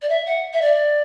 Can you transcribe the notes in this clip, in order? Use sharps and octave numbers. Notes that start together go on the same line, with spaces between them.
D5
E5
F#5
E5
D5